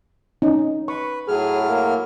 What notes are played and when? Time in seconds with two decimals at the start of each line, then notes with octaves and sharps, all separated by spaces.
0.42 C#4 D#4
0.88 B4 C#6
1.28 A2 F#3 G#4 F6
1.69 A#3